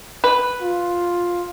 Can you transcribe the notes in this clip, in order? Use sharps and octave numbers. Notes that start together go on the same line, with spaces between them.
B4
F4